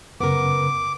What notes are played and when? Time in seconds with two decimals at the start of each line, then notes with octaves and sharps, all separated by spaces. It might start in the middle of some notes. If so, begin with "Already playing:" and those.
0.21 F#2 C#3 B3 A#4 D6